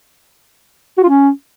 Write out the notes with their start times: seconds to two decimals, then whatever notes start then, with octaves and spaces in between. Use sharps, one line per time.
0.98 F#4
1.03 F4
1.09 C#4